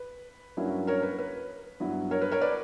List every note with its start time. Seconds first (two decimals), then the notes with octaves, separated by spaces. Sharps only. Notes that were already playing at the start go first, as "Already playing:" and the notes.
Already playing: B4
0.57 G2 F#3 A#3 C#4 E4
0.87 A#4 C#5
1.03 B4
1.18 B4
1.80 G2 F#3 B3 E4
2.11 A#4 C#5
2.22 B4
2.31 A#4 C#5
2.41 B4 D5